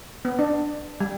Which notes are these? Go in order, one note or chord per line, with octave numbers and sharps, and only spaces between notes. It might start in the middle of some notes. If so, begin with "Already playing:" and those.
B3
D4
G3